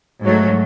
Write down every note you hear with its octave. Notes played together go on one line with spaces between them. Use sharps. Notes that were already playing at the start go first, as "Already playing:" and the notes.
G#2 F#3 A3